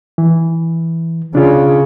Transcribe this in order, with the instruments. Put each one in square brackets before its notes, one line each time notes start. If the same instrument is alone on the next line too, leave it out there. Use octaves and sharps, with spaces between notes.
[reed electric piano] E3
[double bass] C#3 [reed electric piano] D4 F4